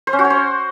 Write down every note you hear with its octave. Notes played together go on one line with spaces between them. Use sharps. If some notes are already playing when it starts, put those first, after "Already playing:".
C5
C#4
F#4
C#5
C5